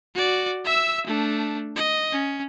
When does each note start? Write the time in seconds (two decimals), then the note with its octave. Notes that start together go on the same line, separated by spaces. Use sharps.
0.15 F#4 D5
0.65 E5 E6
1.07 A3 D4
1.76 D#5
2.12 C#4